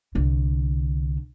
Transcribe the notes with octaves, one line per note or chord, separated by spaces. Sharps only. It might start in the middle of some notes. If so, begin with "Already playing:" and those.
C2 D3